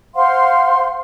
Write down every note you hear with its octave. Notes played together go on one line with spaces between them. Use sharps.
C5 F5 F#5 C6